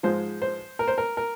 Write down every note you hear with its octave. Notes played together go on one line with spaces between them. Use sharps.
G#2 F3 G#3 C5
C5
A#4
C5
A#4
A#4